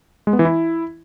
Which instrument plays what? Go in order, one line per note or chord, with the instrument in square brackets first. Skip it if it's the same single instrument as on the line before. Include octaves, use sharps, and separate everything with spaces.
[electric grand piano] G#3
B3
E3
E4